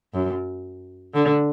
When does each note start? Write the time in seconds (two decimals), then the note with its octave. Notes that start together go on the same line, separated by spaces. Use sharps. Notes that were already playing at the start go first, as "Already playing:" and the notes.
0.14 F#2
1.14 D3